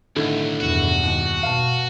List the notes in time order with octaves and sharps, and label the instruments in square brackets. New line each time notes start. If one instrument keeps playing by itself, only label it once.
[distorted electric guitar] B1 [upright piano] A2 D3 D#3
[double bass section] E2 G2 B2 [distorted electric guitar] F#4
[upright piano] D#2
[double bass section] B2 [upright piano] F5 A5